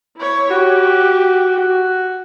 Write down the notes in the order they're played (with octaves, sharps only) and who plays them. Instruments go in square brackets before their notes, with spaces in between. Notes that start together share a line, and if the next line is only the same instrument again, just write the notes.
[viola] E4 C#5
[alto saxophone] F#4 [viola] G4
[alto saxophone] F#4